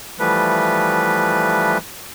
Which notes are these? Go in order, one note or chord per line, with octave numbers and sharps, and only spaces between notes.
E3 F3 G3 A3 B4